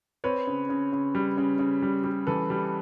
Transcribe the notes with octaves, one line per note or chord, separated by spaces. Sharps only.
C4 B4 C#5
C#3
C#3
C#3
G3
C#3
C#3
G3
G3
E3 A4 B4
G3